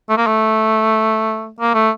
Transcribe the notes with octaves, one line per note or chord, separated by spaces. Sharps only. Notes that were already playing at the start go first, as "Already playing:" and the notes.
A3
A#3
A3
A#3
A3